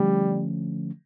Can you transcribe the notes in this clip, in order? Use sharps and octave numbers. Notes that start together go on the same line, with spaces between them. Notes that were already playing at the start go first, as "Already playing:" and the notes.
Already playing: D3 F3 G3 A3 C#4